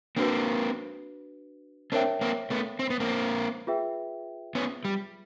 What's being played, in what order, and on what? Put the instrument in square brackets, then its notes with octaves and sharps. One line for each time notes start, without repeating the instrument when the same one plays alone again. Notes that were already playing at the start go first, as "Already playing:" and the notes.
[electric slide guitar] A#3 C4 [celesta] D4 F#4 B4
[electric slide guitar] C4 D4 [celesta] A#4 C#5 E5 G5
[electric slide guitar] A#3 C4
A3 B3
C4
B3
A#3 C4
[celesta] F4 G#4 B4 E5 G5
[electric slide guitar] B3 C#4
G3